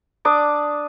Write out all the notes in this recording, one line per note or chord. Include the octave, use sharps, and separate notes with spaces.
D4 D6 D#6